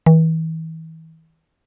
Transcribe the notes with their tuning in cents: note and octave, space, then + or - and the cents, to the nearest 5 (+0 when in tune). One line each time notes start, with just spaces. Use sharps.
E3 -40